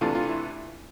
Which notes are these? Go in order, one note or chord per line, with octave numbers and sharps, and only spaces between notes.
C3 E3 A3 D4 F4
F4
E4